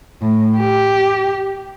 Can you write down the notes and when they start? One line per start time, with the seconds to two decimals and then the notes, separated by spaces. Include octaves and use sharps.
0.22 A2
0.58 G4